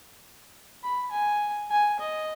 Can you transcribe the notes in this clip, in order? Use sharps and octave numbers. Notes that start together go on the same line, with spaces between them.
B5
G#5
G#5
D#5